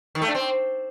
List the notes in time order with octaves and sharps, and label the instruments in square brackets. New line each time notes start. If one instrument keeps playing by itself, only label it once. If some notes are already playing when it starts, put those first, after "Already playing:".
[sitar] D#3
A3
D4
C4